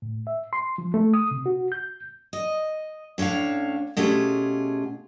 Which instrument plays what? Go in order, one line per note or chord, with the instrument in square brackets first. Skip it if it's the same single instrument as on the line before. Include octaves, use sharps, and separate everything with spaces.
[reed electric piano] A2
E5
C6
F3
A3
D#6
C3
F#4
G6
[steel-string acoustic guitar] D#5
A2 C#4 D4 C#5 F5
B2 A3 C#4 F4 G4 G#4